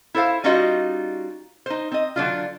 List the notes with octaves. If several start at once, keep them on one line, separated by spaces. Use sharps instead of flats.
E4 A4 C5 F5
G3 C#4 D#4 F4 F#4 D#5
D#4 C5
C4 D#5
D3 F#3 D4 F4